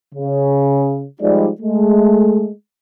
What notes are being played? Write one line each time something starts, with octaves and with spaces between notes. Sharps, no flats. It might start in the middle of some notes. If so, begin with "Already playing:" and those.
C#3
F3 G3 G#3 D#4 G4 D5
G#3 A3